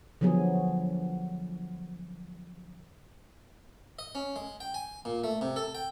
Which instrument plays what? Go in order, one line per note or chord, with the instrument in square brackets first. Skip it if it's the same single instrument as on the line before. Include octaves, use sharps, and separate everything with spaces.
[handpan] D3 F3 F#3 B3 G#4
[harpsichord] D#5
C#4
G#3
G5
G#5
A#2
A3
C3
A4
G5